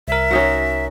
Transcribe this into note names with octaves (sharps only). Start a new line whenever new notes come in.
C2 A#4 E5
C#4 D#4 F#4